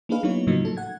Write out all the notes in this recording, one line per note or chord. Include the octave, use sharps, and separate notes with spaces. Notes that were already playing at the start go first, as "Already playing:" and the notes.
A#3 D4 D#4 G#4 B4 F5
F#3 A#3 B3 D#4 E4 C#5
A2 C#3 F3 F#3 A#3 D#4
F#3 A4
F#5 G#6